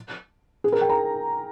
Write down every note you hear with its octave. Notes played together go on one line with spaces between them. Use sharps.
G#4
A#4
G5
A#5